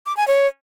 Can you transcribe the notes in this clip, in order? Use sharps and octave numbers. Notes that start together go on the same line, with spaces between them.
D6
G#5
C#5